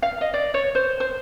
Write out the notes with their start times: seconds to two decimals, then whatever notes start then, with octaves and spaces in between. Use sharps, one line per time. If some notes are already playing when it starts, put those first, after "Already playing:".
0.02 F5
0.21 D#5
0.34 D5
0.54 C#5
0.75 C5
1.00 C5